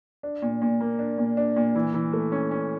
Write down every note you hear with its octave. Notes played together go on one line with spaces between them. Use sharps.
D4
A#2
A#2
A#3
D4
A#2
D4
A#2
E3
E3
A3
C#4
C#4